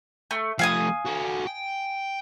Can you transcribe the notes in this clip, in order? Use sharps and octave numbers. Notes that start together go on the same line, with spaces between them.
A3
F3 A3 F5 G#5 D#6
F#4 A4
G5